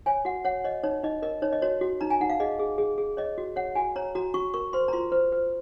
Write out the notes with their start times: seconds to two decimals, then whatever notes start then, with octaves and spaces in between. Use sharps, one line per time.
0.06 C#5 G#5
0.25 F#4 F#5
0.45 C#5 F#5
0.64 C#5 D#5
0.83 D#4 C#5
1.03 D#4 D#5
1.22 A#4 D#5
1.42 D#4 C#5
1.53 D#5
1.62 F#4 C#5
1.81 F#4
2.01 D#4 A#5
2.10 G#5
2.20 D#4 F#5
2.29 F5
2.40 G#4 D#5
2.59 G#4
2.78 G#4
2.98 G#4
3.17 C#5 D#5
3.38 F#4
3.56 C#5 F#5
3.75 F#4 G#5
3.96 C#5 A#5
4.15 F#4 A#5
4.34 F#4 C#6
4.54 A#4 C#6
4.73 C5 C6
4.88 A#5
4.93 F4 C6
5.12 C5
5.32 C5